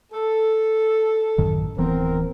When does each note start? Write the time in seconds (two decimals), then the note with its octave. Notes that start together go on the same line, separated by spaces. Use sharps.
0.13 A4
1.38 A1 F#2 D#3
1.78 D1 E3 B3 C4 A#4